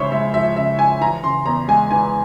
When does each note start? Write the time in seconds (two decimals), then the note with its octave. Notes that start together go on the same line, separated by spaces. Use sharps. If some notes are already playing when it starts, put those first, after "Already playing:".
Already playing: C#3 F3 G#3 E4 C5 C#5 E5
0.12 G#3 E5
0.34 F3 E5
0.56 C#3 E5
0.78 E4 G#5
1.01 E3 A#5
1.24 C#3 C6
1.46 E2 A#5
1.68 G#3 G#5
1.91 E3 G#5